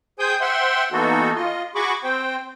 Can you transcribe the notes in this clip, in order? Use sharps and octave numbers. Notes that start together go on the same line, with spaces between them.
G#4 C5 G5 G#5 D#6 G6
C5 E5 F#5 G5 C6
E3 A#3 B3 D#4 F#4 A4
F4 D#5
F#4 G#4 B5 C#6 D6
C4 C5 G5